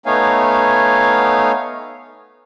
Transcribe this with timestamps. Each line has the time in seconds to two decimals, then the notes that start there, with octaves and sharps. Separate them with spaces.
0.06 A3 B3 D#4 C#5 F5 G#5